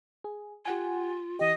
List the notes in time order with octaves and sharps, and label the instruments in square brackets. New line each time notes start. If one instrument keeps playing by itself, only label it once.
[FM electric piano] G#4
[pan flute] F4 [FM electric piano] G4 F#5 G#5
[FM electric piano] E3 G4 [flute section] D#5